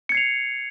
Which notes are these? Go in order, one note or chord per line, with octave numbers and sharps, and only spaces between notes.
G#6 C7 C#7 F7